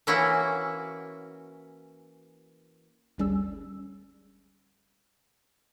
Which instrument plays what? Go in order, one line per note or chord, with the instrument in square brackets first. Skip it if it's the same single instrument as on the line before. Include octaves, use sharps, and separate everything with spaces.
[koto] E3 A#3 C#4 E4 F#4
[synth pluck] G1 D2 G3 C#4 G#4 E6